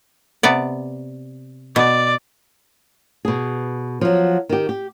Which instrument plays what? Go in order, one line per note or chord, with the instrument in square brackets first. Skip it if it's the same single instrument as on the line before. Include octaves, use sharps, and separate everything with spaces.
[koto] C3 B3 D5
[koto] B2 [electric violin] D5
[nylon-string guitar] B2 G#4
F3 F#3
D#3 G4
G4